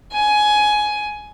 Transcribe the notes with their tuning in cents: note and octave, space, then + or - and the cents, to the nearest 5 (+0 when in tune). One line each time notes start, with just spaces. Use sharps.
G#5 +15